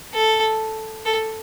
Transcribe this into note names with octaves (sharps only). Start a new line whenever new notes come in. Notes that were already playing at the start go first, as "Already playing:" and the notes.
A4
A4